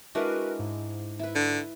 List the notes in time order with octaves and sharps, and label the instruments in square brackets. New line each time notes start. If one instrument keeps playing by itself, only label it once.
[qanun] G#3 D4 E4 [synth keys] F#4 A#4 B4
[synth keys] G#2
[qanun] E4 B4
[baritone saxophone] D3